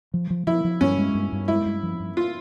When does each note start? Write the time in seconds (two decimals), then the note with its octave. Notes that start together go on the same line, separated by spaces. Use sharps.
0.14 F3
0.30 F3
0.47 F3 E4
0.64 F3
0.81 G2 C#4
0.98 G#3
1.15 G2
1.32 G2
1.48 G#3 E4
1.66 G2
1.83 F3
2.00 G2
2.17 F4